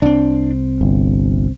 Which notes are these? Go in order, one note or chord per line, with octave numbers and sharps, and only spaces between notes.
C2 C4 D4
G1